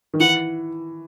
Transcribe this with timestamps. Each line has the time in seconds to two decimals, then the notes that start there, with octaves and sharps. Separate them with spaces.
0.14 D#3
0.20 E3 F#5